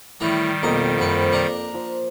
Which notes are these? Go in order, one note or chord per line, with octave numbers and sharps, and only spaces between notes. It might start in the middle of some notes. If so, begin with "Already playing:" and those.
A2 D#3 E3 G3 A3
B1 F2 A#3 D#5
F#2 B4 C5
D4 A#4
F3